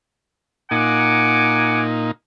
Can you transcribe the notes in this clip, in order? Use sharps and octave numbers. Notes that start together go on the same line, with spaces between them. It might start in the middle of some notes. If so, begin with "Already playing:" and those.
A#2 D#4 F#5 G#5 D6